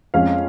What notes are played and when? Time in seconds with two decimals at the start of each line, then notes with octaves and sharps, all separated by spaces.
0.14 F2 F3 G#3 C#4 F5